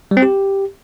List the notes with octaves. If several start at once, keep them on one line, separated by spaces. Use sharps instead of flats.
G3
C4
G4